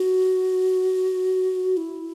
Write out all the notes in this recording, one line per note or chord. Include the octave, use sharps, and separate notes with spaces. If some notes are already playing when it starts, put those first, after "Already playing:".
Already playing: F#4
E4